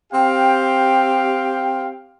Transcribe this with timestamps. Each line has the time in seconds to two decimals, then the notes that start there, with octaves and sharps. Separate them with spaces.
0.13 C4 G4 F5 G5